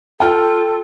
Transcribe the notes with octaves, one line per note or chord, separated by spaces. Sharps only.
F4 A4 G5 F6